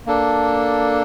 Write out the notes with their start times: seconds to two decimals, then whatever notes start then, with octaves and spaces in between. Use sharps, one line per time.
0.06 A#3 D4 A4